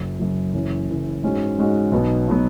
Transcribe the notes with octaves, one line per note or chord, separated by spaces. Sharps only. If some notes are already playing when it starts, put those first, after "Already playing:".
Already playing: F#1 F#2 F#3
F#1 F#2 F#3
F#1 F#2 E3 C#4
F#1 F#2 E3 C#4
G#2 G#3 C#4 F#4
G#2 G#3 C#4 F#4
B1 B2 F#3 B3
B2 F#3 B3